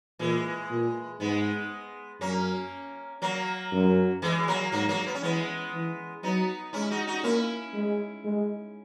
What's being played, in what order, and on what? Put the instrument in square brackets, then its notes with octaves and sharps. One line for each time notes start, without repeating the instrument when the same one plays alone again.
[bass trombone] A#2 [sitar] E3 G#3
[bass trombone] A#2
[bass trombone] G#2 [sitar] G#3 B3
[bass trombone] F#2 [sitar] A#3 C#4
[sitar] F#3 A#3
[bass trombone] F#2
[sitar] E3 G#3
F#3 A#3
[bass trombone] G#2 [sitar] F#3 A#3
[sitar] F#3 A#3
B3
C#4
[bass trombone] E3 [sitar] G#3 B3
[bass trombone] E3
[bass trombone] F#3 [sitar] B3 D#4
[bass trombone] G#3 [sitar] C#4 E4
[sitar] D#4 F#4
D#4 F#4
[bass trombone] A#3 [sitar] C#4 E4
[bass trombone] G#3
G#3